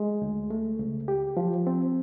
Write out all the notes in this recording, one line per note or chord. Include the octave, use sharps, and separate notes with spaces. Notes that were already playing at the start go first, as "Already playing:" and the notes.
Already playing: G#3
D2
A3
C#2
G4
F3
C4